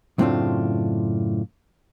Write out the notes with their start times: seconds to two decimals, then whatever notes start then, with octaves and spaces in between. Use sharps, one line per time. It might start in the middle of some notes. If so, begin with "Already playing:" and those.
0.18 F#2 A2 C#3 C4 D4 F4